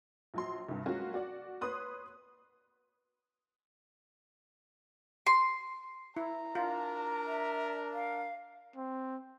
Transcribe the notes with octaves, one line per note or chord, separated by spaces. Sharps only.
A#1 F#3 C6
C2 G2
F#3 G#3 A#3 C#4 F4 F#4
F#4 D5 F#5
B4 C#5 C6 D#6 F#6
C6
E4 A#5
D4 F4 A#4
E5
F5
C4